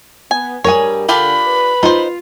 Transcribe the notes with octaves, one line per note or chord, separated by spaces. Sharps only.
B3 G#5
G2 G3 G#4 A#4 C#5 G#5
D3 D4 F4 G4 B5
B4
D#4 F4 C5